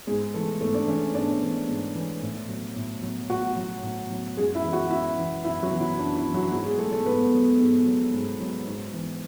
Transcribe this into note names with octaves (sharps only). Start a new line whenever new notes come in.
G#2 G#3 G#4
E3 A3 A4
G#2 A3 A4
D4 D5
E3 C#4 C#5
G#2 D4 D5
E3
G#2
E3
A2
F#3
A2
F#3
A2 F#4 F#5
F#3
A2
F#3
F#2 G#3 G#4
E4 E5
E3
F#4 F#5
F#2 E4 E5
E3
F#2 E4 E5
F#3 F#4
E3
E4
F#2 D4
E4
E3
F#3 F#4
G#2 E4
G#3 G#4
F#3 A3 A4
A3 A4
G#2 B3 B4
F#3
G#2
F#3
G#2
F#3
G#2
E3